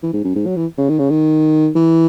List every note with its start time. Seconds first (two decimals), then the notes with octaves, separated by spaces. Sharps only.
0.03 E3
0.13 G#2
0.24 F#2
0.35 G#2
0.46 F#3
0.56 E3
0.78 C#3
0.89 D#3
0.99 C#3
1.10 D#3
1.75 E3